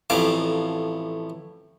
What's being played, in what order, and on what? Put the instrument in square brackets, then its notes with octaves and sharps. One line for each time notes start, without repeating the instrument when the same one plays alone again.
[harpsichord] A1 F2 A2 F5 D6